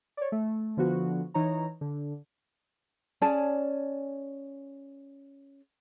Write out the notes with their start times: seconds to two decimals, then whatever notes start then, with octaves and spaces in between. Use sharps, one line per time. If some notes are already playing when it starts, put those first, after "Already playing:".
0.17 C#5 D5
0.32 A3
0.77 D3 F3 B3 F#4
1.34 E3 D#4 C#5 A#5
1.81 D3
3.22 C#4 G#4 D5 A5